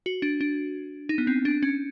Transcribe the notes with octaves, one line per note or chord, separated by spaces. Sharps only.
F#4
D4
D4
D#4
B3
C4
D4
C#4